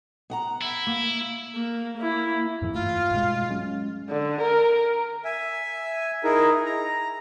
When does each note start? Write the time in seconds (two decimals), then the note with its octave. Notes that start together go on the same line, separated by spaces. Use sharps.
0.30 B3 F#5 A#5
0.61 E4
0.87 A#3
1.55 A#3
1.98 A#3 E4
2.62 F2 G#2 E3
2.74 D1 G2 A3 F4
3.11 G#2 B2 G#3
3.49 F#3 G#3 C#4
4.10 D3
4.42 A#4
5.25 E5 G#5
6.24 D#4 E4 G#4 A#4
6.66 A#5